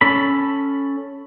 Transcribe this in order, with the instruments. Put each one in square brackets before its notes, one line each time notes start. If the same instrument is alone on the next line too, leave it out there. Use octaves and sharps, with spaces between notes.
[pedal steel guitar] C#4 A4 B5